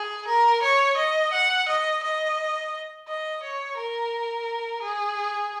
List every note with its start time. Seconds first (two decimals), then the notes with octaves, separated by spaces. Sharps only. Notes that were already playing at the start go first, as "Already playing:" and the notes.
Already playing: G#4
0.27 A#4
0.62 C#5
0.97 D#5
1.33 F#5
1.68 D#5
2.03 D#5
3.08 D#5
3.43 C#5
3.77 A#4
4.82 G#4